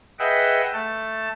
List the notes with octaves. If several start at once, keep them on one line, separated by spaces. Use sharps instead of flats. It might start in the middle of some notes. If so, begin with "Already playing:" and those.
G#4 B4 D#5 E5 F#5 G5
A3 A5